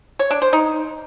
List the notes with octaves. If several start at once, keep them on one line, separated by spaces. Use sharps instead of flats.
C#5
D4
C5
D#4